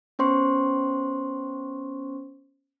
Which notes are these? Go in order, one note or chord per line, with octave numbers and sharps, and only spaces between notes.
B3 C#4 C5 C6 C#6